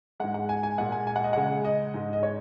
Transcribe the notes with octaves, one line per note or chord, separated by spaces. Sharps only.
G#2 G#3 F#5
F#5
G#5
G#5
A#2 G#3 F#5
G#5
G#5
F#5
D#5
C#3 G#3 F#5
D#5
G#2 G#3
D#5
C#5